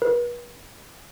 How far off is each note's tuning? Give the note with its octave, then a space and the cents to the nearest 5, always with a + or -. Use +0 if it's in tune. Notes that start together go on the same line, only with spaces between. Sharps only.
B4 -40